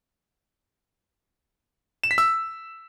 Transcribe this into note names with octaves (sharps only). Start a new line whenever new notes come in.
E7
B6
E6